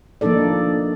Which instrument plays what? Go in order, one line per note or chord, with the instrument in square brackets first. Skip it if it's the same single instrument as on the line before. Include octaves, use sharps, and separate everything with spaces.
[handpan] F3 A#3 D4 D#4 A4 D5